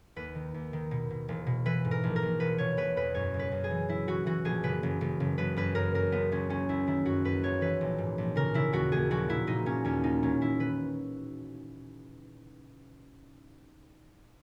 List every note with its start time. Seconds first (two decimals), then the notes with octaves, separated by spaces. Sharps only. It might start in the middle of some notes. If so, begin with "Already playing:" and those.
0.16 D#2 B4
0.35 D#3
0.54 D#2
0.73 D#3
0.91 B2
1.11 B2
1.29 E1
1.47 B2
1.65 E3 B4
1.85 G#2
1.91 A#4
2.04 A#1
2.16 A#4
2.22 A#1
2.40 E1 B4
2.58 B2 C#5
2.77 E1 B4
2.96 E2 B4
3.15 F#2 C#5
3.34 F#1
3.39 B4
3.52 F#2
3.64 G#4
3.71 E3
3.89 E3 E4
4.07 E3 F#4
4.26 E3 F#4
4.45 A#1 G#4
4.63 F#1 B4
4.83 F#1
5.01 F#1
5.20 F#1
5.38 F#1 B4
5.56 F#2 B4
5.75 F#2 A#4
5.94 F#2 A#4
6.12 C#2 B3
6.32 C#2 C#4
6.49 C#2 C#4
6.69 C#2 E4
6.87 D#3 E4
7.05 F#2 F#4
7.25 F#2 B4
7.43 G#1 C#5
7.61 E3 B4
7.81 A#1
7.98 G#2
8.18 A#1
8.36 C#3 A#4
8.54 C#3 E4
8.73 D#2 F#4
8.92 D#2 G#4
9.11 A#1 F#4
9.29 A#2 E4
9.47 A#2 D#4
9.66 A#2 C#4
9.85 D#2 C#4
10.04 D#3 D#4
10.22 E1 C#4
10.41 E1 E4
10.59 D#3 B4